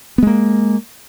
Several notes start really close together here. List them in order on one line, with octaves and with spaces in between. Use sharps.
B3 G#3 A#3